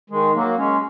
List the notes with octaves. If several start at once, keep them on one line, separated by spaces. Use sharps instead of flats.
D#3 G#3
F#3 A#3
G#3 C#4